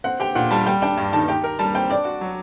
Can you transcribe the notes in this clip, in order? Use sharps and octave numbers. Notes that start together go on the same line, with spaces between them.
C4 F#5
G4 G5
A#2 F#5
G3 A5
G3 G5
D4 G5
G2
D#3 A5
G4 G5
A#4
G3 A5
C4 G5
D4 D5
F#4
F#3